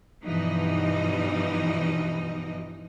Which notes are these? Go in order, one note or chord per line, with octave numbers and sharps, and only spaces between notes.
G2 B2 E3 F3 D#4 D#5